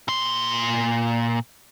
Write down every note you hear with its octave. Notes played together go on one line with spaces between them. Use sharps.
A#2 C6